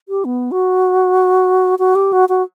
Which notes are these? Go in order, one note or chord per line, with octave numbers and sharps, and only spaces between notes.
G4
B3
F#4
F#4
G4
F#4
F#4